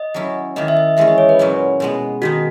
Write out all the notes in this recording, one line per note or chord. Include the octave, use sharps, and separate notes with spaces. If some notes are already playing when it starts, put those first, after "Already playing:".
Already playing: D#5
F#3 C#4 E4
D#3 A#3 E4 D#5
E5
D#5
E3 G#3 C#4 E5
D#5
C#5
B4
A#2 F#3 C#4 E4
B2 G#3 B3
D#3 G#3 D#4 F#4